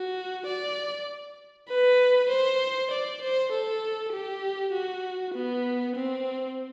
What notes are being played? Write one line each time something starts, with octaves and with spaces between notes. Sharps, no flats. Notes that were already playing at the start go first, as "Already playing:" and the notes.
Already playing: F#4
D5
B4
C5
D5
C5
A4
G4
F#4
B3
C4